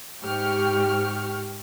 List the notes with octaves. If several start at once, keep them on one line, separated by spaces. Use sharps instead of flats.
G#2 G4 G5 C#6 F6